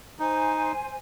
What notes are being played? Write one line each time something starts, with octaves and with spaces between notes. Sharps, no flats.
D#4 C5 G#5